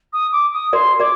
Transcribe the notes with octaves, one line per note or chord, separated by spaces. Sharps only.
D#6
D6
D#6
A#4 D5 C6
A#4 D5 D6